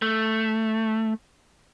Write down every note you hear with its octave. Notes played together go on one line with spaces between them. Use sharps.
A3